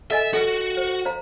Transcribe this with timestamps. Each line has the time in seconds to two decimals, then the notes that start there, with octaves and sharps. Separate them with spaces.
0.11 A4 D#5 E5 G#5
0.34 F#4 A4 B4
0.77 C5
1.05 C5 F5 A#5